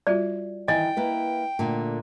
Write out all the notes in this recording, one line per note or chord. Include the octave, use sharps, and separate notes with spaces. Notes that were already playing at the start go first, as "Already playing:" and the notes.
G3 F4 F#4 D5
D#3 E3 D#5 G5 G#5
A#3 E4 B4
A#2 D3 A3